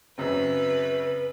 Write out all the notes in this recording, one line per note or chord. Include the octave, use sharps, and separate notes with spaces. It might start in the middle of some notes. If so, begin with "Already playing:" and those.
F#2 C#3 C4 B4